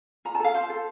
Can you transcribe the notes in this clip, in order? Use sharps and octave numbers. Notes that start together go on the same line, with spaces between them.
F4 A#5
A5
A4 F5
F4 C5
A4